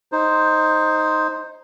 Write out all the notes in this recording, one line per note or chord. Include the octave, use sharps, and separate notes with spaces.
D#4 C5